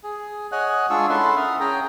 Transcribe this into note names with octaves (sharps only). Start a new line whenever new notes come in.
G#4
C#5 D#5 F#5 G#5 F#6
G#3 D4 F4 G#4 C#6 E6
C#4 E4 A4 E5 F#5 C6
A#4 E5 D#6 F6
C#4 G#4 G5 A#5